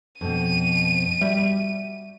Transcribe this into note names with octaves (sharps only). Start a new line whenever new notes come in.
F2 B2 D#7
G3 F#4 E5